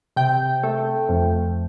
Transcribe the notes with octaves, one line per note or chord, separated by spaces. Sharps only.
C3 G5
A3
F2